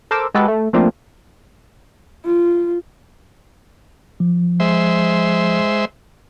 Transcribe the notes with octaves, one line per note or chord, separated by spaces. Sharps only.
A4 A#4 C5 D6 E6
G#3 F#4 G4 A4 B4
A3
F3 A3 A#3 C4 D4 F4
F4
F3
G#3 C5 E5